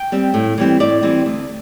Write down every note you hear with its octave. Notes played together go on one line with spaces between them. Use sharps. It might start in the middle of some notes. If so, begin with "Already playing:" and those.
Already playing: G5
G3 C4
A2
E3 G3 C4
A2 D5
E3 G3 C4
D2